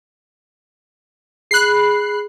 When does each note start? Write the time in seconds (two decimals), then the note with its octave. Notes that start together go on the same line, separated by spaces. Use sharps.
1.51 G#4 B5 F#6 C7